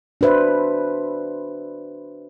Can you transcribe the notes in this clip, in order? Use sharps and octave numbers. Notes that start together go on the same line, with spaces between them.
D4 F#4 B4 C5 E5